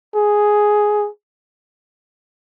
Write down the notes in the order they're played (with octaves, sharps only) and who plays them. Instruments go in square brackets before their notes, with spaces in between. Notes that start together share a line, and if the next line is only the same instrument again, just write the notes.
[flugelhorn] G#4